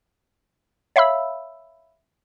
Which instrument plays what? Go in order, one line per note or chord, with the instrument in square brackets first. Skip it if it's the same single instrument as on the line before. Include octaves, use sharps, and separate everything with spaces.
[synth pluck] C#5 E5 F5 B5 E6